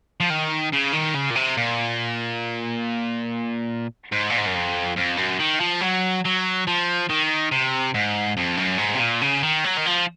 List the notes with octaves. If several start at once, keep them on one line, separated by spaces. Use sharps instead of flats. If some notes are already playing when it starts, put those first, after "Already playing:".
F3
D#3
C#3
D#3
C#3
A#2
C3
A#2
G#2
A#2
G#2
F#2
F2
F2
F#2
D#3
F3
F#3
F#3
F3
D#3
C3
G#2
F2
F#2
G#2
C3
A#2
C#3
D#3
F#3
D#3
F3